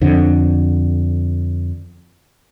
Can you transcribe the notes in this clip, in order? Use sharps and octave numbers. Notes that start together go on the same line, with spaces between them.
F2 D3